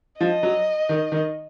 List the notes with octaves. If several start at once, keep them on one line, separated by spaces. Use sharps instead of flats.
F3 D#5
F#3
D#3
D#3